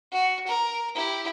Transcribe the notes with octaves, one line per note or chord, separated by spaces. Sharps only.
F#4
A#4
E4 G4